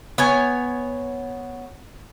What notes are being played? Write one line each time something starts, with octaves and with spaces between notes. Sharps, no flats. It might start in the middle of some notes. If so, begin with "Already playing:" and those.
B3 C#5 G#5